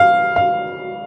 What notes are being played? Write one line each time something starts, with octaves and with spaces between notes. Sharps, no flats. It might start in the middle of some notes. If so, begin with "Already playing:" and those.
Already playing: F5
F5